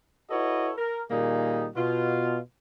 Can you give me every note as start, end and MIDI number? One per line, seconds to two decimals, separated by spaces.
0.30 0.72 64
0.30 0.72 66
0.30 0.72 69
0.30 0.72 71
0.30 0.72 73
0.30 0.72 75
0.78 1.02 70
1.10 1.68 46
1.10 1.68 51
1.10 1.68 55
1.10 1.68 58
1.10 1.68 63
1.10 1.68 68
1.76 2.38 47
1.76 2.38 65